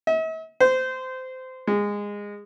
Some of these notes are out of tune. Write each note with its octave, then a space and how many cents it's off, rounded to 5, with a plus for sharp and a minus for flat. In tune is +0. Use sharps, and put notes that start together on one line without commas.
E5 -45
C5 -20
G#3 -20